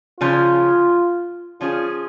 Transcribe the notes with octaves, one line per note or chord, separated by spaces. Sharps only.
C#3 F3 C#4 F4
F3 C#4 F4 G#4